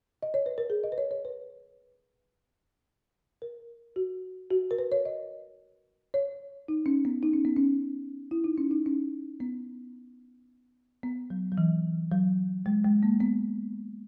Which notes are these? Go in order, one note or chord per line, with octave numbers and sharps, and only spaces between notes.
D#5
C#5
B4
A#4
G#4
D#5
B4
C#5
C#5
B4
A#4
F#4
F#4
A#4
B4
C#5
D#5
C#5
D#4
C#4
B3
D#4
C#4
B3
C#4
E4
D#4
C#4
D#4
C#4
B3
B3
F#3
F#3
E3
F#3
G#3
G#3
A#3
B3